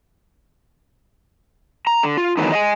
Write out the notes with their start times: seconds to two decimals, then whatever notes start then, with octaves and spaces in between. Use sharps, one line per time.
1.87 A#5
2.03 D3
2.17 F4
2.37 D#3 E3 F#3 A3 B3 D#4
2.52 D#5 F5 G#5